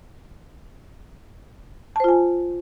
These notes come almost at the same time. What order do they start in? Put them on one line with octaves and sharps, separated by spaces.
A5 C5 F4 G#5